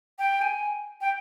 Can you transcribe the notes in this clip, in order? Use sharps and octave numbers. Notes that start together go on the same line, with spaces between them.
G5
G#5
G5